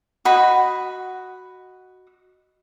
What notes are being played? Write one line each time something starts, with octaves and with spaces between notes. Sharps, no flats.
F#4 D#5 B5